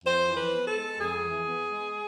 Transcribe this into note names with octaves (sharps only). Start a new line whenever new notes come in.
F2 C5
E3
B4
B3
A4
G#3
F2 G#4
E3
B3
G#3